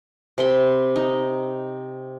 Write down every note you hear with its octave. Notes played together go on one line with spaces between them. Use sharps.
C3 B5 C6
D#4